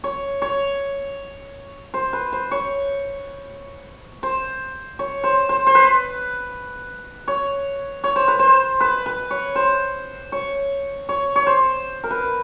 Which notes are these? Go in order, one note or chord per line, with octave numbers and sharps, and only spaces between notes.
C#5
C#5
C5
B4
C5
C#5
C5
C#5
C5
C5
C5
B4
C#5
C#5
C5
B4
C5
B4
B4
C#5
C5
C#5
C#5
C#5
C5
A#4
B4